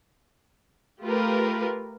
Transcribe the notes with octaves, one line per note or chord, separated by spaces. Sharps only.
A3 F4 G4 A#4 B4